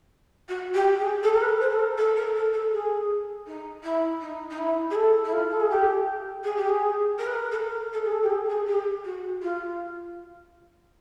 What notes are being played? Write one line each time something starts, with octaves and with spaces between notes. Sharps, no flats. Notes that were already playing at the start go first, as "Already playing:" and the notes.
F#4
G4
G#4
A4
A#4
B4
C5
A4
A#4
A4
A#4
A4
A4
G#4
D#4
E4
D#4
D#4
E4
G#4
A4
E4
F4
A4
G#4
G4
G#4
G4
G#4
A#4
B4
A#4
A4
A#4
A4
G#4
A4
G4
G#4
A4
G#4
G4
F#4
F4